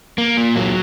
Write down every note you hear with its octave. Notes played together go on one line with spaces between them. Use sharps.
A#3
A#2
F#3